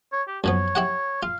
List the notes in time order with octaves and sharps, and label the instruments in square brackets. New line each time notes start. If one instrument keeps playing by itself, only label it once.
[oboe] C#5
G4
[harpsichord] F#2 F3 B3 [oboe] C#5
[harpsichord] E4 G4 F#5
[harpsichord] F4 [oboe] F5